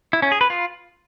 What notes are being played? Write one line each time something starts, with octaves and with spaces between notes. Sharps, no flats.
E4
C#4
G#4
B4
F4